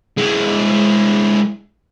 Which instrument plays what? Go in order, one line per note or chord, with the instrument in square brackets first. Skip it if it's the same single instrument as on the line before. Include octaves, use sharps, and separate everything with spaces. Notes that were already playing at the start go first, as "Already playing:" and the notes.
[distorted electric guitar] G#3 E4